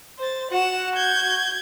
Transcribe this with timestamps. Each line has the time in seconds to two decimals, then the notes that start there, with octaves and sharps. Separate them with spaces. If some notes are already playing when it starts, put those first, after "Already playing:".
0.19 C5 A6
0.51 F#4 F#5 E7
0.96 G6 G#6